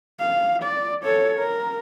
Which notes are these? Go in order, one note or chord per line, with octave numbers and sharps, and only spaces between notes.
F5
D5
A4 C#5
A#4